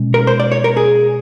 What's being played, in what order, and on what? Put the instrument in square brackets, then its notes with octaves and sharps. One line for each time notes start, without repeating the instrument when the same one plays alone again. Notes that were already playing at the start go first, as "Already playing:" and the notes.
Already playing: [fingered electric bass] B2 G#3 C#4
[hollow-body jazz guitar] A#4
C5
D5
C#5
A#4
G#4